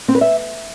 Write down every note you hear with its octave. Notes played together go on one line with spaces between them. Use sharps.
C4
B4
E5